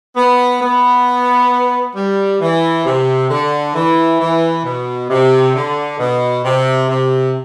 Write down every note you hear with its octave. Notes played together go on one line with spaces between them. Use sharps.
B3
B3
G3
E3
C3
D3
E3
E3
B2
C3
D3
B2
C3
C3